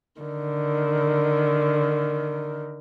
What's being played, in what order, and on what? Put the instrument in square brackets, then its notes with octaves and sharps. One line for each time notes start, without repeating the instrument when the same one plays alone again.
[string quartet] D3 D#3